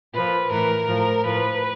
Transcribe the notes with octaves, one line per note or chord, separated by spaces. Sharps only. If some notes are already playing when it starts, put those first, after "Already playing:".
A#2 F3 B4
A2 E3 A#4
A2 F3
A2 F3 B4